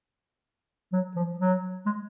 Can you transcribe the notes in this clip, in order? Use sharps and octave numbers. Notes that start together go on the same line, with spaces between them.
F#3
F3
F#3
G#3